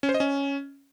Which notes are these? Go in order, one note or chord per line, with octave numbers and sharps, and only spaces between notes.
C#4
C5
D#5
C#4